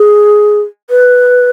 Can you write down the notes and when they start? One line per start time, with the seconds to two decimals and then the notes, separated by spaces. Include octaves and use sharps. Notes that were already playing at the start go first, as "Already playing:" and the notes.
Already playing: G#4
0.90 B4